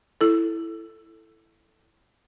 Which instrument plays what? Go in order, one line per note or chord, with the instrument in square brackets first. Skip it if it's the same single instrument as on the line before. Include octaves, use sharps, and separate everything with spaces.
[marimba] E4 A4